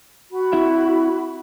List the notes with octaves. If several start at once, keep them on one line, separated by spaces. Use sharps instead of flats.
F#4 B5
C4 E4 E5